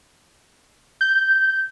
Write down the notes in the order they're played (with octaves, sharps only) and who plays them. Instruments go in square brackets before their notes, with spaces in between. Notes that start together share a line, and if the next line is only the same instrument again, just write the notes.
[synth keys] G6